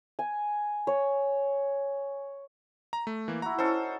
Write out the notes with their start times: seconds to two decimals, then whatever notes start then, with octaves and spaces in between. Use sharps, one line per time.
0.19 G#5
0.87 C#5
2.93 A#5
3.07 A3
3.28 E3 A#3
3.42 E4 F#4 A#5
3.59 C#4 D#4 A4 C5